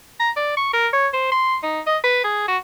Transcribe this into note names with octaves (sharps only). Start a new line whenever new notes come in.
A#5
D5
C#6
A#4
C#5
C5
C6
D#4
D#5
B4
G#4
F#4